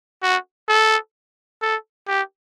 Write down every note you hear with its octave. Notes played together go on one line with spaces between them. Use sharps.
F#4
A4
A4
G4